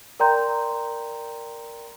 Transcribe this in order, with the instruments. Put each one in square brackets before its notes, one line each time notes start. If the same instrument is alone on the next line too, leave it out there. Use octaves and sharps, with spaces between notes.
[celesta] A#4 D5 G5 A#5 C6 G6